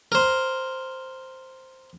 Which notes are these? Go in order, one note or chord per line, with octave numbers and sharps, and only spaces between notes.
A#4 C5